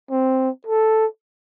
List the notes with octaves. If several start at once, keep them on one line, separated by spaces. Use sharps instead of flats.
C4
A4